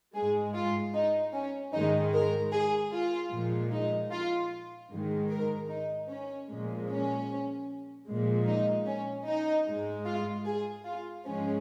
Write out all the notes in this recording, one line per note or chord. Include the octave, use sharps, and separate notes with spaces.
G#2 G#3 G#4
F4
D#4
C#4
G#2 D#3 G#3 D#4
A#4
G#4
F4
A#2 F3 G#3
D#4
F4
G#2 D#3 G#3
A#4
D#4
C#4
A#2 F3 G#3
C#4
A#2 F3 G#3
D#4
C#4
D#4
G#2 G#3
F4
G#4
F4
G#2 F3 G#3 C#4